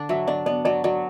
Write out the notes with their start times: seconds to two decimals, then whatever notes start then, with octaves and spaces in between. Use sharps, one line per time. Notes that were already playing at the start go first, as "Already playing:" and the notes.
Already playing: D3 D4
0.09 F#3 E5
0.27 D4 D5
0.46 B3 D5
0.65 F#3 D5
0.84 F#3 D5